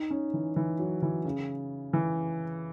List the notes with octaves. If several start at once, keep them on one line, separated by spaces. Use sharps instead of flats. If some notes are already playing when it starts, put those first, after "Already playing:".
Already playing: D#4
C#4
E3
E3
F#3
E3
C#3
E3